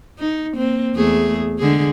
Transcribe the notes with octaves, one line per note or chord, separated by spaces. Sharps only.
D#4
A#3 C4
E2 A3 G#4
D3 G#3 G#4